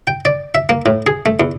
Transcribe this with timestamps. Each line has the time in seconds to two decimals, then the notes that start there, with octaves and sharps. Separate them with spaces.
0.07 G5
0.25 D5
0.55 E5
0.69 A#3
0.86 A2
1.07 G#4
1.26 A3
1.40 E2